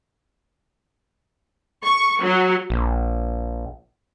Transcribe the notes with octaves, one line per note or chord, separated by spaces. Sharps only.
C#6
F#3
A#1